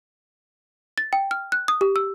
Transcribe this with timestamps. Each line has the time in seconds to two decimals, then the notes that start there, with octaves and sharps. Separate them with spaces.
0.98 A6
1.13 G5
1.31 F6
1.52 F#6
1.68 D#6
1.81 G4
1.96 E6